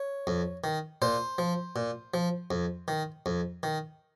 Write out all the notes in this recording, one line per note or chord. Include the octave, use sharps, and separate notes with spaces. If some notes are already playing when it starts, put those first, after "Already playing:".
Already playing: C#5
F2
D#3
A#2 C5
F3
A#2
F3
F2
D#3
F2
D#3